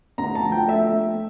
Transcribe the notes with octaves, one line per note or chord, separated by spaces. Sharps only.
D2 A#5
A5
F3
G5
A3 E5
A3